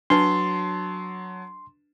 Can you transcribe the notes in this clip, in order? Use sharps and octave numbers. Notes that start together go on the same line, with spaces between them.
F#3 D4 B4 A5 C6